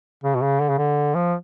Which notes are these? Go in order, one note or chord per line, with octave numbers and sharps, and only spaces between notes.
C#3
B2
C#3
D3
C#3
D3
F3